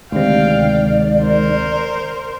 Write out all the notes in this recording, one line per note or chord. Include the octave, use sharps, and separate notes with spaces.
D2 C3 D#3 G#3 D5 F5 G5
A#4 C5